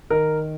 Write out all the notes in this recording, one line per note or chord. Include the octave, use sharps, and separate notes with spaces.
D#3 A#4